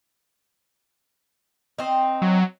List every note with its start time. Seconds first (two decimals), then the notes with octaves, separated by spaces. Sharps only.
1.78 C4 D#4
2.22 F#3